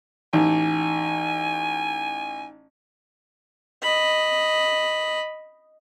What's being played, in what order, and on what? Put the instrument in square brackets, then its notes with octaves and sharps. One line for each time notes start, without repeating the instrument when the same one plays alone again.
[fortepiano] A1 [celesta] D#4 [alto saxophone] G#5
[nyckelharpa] D#5 B5